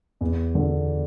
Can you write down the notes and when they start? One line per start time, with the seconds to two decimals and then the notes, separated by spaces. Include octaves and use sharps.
0.21 E2
0.55 D3